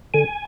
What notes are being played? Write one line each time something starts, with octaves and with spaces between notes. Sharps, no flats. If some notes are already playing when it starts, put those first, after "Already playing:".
D3 G#5